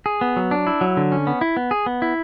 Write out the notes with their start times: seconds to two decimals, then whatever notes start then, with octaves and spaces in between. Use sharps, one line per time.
0.06 G#4
0.21 B3
0.36 F#3
0.51 D4
0.67 E4
0.81 F#3
0.97 D3
1.12 C#4
1.27 B3
1.41 E4
1.57 B3
1.71 G#4
1.86 B3
2.02 E4